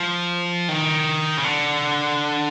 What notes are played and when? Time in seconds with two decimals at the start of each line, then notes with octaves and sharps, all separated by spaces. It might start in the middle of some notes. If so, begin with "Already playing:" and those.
Already playing: F3
0.69 D#3
1.37 C#3
1.44 D3